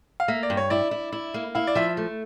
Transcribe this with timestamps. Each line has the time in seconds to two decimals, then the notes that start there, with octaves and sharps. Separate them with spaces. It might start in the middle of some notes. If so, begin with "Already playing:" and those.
0.20 F5
0.28 A#3 E5
0.43 D5
0.50 G2
0.57 C#5
0.70 E4 D5
0.91 E4
1.12 E4
1.34 A#3
1.55 E4 F5
1.67 D5
1.75 F3 E5
1.97 A3